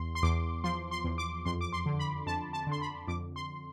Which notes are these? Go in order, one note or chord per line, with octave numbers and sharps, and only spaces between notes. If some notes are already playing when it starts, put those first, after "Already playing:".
Already playing: E2 C6
C6
E2 D6
F3 C6
C6
E2
D6
F2 C6
D6
C6
D3
B5
F2 A5
A5
D3 C6
B5
F2 D6
C6